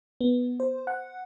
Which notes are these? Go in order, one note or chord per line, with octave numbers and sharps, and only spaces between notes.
B3
C5
F#5